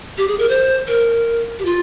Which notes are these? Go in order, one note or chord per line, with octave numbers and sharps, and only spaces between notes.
G4
G#4
A#4
C5
A#4
G4
F4